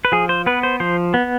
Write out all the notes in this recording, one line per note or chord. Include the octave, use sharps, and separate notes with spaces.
B4
F3 G#4
C5
B3 B4
C5
F3 C5
B3